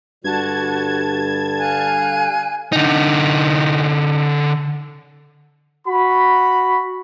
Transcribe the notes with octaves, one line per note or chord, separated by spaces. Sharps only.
G2 D3 G3 F#4 A5 G#6
F5 G#5 F#6
D3 D#4
F#4 B5